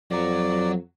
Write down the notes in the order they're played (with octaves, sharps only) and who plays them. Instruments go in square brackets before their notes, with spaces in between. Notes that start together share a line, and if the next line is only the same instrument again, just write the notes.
[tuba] F2 [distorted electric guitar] F#3 A#5 [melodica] D5